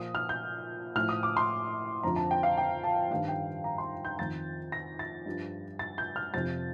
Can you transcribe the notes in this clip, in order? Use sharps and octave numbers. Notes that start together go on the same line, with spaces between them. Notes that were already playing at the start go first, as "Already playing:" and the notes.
Already playing: A#2 F3 D#6
F6
G6
A2 F3 F6
D#6
D6
C6
F2 D3 F3 A#5
A5
G5
F5
G5
A5
G2 D#3 F5
G5
A#5
C6
G6
F2 D#3 A6
A#6
A6
G2 F3
A6
G6
F6
F2 C3 F3 A6